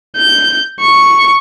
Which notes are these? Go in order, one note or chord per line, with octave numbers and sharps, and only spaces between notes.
G6
C#6